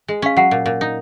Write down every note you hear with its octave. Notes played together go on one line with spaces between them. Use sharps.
G#3
C#4 F5
F#3 F#5
A#2
A#2
D#4